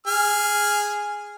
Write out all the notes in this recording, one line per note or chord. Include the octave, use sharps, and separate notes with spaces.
G#4 F6